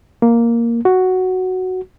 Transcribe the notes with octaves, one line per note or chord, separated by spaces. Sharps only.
A#3
F#4